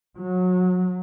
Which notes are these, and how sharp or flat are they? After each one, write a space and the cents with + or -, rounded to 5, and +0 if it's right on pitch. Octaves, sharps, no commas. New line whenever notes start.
F#3 -25